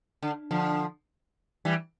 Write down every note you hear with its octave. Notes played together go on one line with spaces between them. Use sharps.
D3
D3 F3
E3 G3